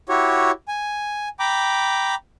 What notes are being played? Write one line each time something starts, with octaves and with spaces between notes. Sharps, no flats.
E4 F#4 G4 C#5
G#5
G5 A#5 B5 D6